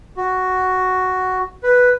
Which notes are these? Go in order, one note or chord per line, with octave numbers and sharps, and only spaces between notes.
F#4
B4